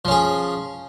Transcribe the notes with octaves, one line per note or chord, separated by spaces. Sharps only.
F3 C#4 G#4